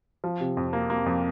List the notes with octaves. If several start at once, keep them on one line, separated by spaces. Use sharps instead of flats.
F3
C3
F2
A#3
A#3
F2